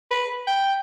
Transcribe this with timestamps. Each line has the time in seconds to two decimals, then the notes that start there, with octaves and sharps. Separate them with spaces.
0.11 B4
0.47 G5